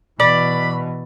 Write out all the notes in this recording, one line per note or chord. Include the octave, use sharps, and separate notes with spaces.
B2 E3 D5 B5